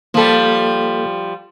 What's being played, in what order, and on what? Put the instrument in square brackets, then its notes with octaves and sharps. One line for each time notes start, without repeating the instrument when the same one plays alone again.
[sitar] F3 G3 [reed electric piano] A#3 A4